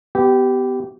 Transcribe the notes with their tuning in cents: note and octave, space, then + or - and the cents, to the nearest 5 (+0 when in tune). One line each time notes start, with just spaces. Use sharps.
B3 +20 G4 -15